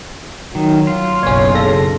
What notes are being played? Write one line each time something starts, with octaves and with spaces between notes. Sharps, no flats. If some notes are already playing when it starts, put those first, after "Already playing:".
D#3 F#3
F4
F#1 B1 C#4 C#5
C#3 A4 A#6